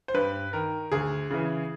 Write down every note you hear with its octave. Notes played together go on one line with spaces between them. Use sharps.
C5
G2 B4
D#3 A#4
D2 G#4
C#3 E3